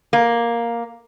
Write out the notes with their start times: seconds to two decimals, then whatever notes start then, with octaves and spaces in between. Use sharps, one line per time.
0.13 A#3